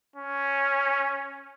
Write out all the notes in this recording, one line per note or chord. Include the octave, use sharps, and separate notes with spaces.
C#4